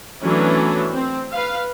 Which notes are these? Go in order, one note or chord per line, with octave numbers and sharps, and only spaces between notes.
E3 F#3 A3 B3 C#4 D4
C4
B4 F5